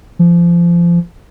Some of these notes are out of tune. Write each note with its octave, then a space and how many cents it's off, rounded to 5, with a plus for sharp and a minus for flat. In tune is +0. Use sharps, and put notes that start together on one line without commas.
F3 -25